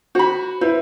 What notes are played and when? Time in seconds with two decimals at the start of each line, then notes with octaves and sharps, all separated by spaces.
0.15 F#4 C5 B5
0.61 E4 B4 C5